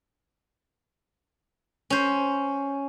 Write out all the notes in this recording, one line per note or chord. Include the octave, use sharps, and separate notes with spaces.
C#4 C5